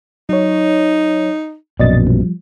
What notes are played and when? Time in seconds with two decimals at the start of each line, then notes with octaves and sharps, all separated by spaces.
0.29 F#3 D#4 C#5
1.80 A#1 F#2 B2 D5 D#5 A6
2.07 F3 G3